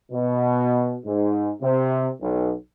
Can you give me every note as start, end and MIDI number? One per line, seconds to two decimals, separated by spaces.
0.11 0.95 47
1.05 1.50 44
1.61 2.09 48
2.20 2.52 35